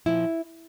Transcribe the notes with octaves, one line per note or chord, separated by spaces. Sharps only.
A#2 F3 E4